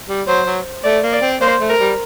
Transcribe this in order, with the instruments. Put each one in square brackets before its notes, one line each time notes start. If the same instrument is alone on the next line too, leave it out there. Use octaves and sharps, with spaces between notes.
[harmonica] G3
[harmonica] F#3 [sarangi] C5
[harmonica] F#3
[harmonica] A3 [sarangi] D5
[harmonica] A#3
[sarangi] D5
[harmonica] C4
[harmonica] A#3 [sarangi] C5
[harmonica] A3
[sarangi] A#4
[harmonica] G3